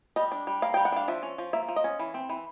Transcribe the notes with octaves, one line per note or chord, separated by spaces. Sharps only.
G3 D#5
D4
G3
A#3 F5
G3 G5
F#5
D4 F5
F3 E5
C#4
F3
A#3 E5
F3
D#5
C#4
E3
C4
E3